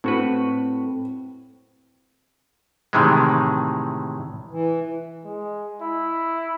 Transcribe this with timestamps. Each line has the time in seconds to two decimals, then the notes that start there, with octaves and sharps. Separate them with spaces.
0.04 A2 C4 F#4 B4
2.93 A2 C3 D#3 E3 G#3
4.50 E3
5.25 G#3
5.81 E4